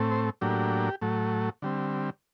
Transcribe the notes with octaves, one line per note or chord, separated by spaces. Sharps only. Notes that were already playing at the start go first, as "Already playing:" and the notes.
Already playing: A2 A3 C4
C5
A2 F#3 A#3 D4 G4
A2 F#3 A3
D3 G3 C4